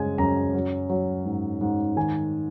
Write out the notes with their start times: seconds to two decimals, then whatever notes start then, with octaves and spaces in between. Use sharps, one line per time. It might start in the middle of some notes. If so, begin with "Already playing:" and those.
Already playing: F#2 C#3 G#3 G#5
0.18 F#2 A#5
0.54 F#3
0.89 F#3
1.26 G#2
1.61 G#2
1.96 D#3 G#5